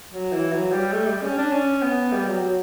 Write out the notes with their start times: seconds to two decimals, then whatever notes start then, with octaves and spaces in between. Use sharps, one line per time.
0.13 F#3
0.33 E3
0.53 F#3
0.72 G3
0.93 A3
1.07 G3
1.22 C#4
1.38 D4
1.52 C#4
1.82 B3
2.12 G3
2.27 F#3
2.42 F#3